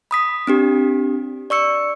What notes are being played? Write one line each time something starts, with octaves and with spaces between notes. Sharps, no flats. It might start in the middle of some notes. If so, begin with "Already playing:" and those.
B5 D#6 B6
C4 D4 G4
D5 C#6 E6 C#7